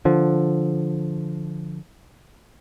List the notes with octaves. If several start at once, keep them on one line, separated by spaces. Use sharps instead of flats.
D3 F3